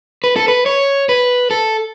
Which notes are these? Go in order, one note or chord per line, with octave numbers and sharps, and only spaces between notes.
B4
A4
B4
C#5
B4
A4